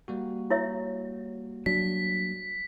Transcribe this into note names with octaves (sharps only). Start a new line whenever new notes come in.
G3 A#3 F#4
E4 C#5 E5
F#3 D4 B6